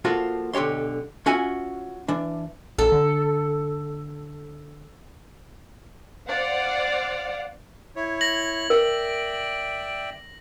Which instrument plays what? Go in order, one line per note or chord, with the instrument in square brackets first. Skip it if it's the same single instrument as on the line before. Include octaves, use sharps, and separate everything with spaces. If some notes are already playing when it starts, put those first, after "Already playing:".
[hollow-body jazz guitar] F3 A#3 F4 F#4 A4
B1 D3 G4 C#5 C6
C#4 F4 F#4 E5 F#5 G#5
E3 D4
[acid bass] A#1 [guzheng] A4
[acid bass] D3
[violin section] C5 D5 F5 F#5
[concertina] E4 C#5
[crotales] A#6 F#7
[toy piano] A#4 [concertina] D5 E5 G5